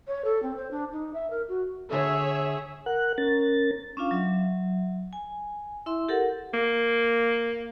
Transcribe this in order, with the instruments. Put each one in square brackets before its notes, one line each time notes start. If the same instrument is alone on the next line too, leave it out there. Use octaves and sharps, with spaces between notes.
[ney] C#5
A4
C4
C5
D4
D#4
E5
A#4
F#4
[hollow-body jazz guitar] D3 [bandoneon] G#4 [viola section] C#5 E5
[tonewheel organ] A#4 F#5 F#6
C#4 A#4 A6
[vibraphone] C#4 D4 F4 F5
F#3 E5
G#5
E4 E5 C6
G4 A4 A#4 F#5
[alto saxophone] A#3